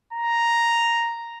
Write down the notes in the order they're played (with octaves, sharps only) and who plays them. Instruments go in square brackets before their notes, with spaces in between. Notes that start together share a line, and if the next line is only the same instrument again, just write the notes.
[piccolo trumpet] A#5